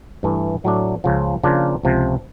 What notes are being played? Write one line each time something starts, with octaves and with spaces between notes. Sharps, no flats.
G2 E3 A3
A2 F#3 A3 D4
C#2 C#3 F3
C#3 F3 A#3 D4 F4
C#2 C3 F3